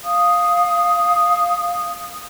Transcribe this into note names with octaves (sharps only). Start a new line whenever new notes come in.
F5 D#6